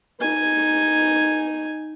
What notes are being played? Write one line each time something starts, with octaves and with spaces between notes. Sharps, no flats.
D#4 G#5